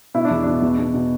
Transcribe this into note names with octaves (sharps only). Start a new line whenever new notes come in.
B2 E4
D4
E2
B2 D4
E2
B2
B2